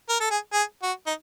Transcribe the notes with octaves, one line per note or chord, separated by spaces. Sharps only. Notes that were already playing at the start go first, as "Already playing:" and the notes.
A#4
A4
G#4
G#4
F#4
D#4